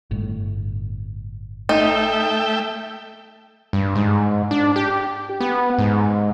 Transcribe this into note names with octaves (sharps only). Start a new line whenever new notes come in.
G1 A2
A3 D#4 E5 G5
G2
G#2
D4
G4
B3
G#2